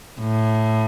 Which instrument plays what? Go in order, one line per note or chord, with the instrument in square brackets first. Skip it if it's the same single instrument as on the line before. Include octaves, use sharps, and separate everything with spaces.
[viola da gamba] A2